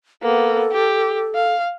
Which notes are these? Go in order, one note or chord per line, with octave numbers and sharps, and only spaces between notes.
A#3 B3 A4
G4
F5